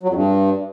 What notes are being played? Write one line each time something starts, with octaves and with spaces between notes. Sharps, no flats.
F#3
F2
G2